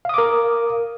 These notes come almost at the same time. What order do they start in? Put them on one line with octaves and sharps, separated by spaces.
F5 D#6 D6 A#4